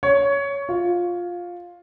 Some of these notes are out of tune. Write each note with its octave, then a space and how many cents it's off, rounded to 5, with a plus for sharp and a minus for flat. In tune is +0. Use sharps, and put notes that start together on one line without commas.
C#5 +15
F4 +10